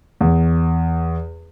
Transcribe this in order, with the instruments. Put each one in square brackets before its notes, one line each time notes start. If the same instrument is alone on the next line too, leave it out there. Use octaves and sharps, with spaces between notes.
[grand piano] E2